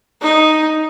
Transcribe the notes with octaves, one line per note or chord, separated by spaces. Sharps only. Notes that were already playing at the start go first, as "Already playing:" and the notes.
D#4